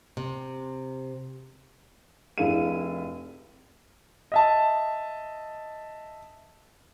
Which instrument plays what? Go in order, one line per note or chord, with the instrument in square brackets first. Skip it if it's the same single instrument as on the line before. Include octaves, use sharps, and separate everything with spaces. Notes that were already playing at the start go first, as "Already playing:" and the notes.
[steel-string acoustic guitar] C3
[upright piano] F1 D4 E4 G#4 F5 D#7
[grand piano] D#5 E5 A5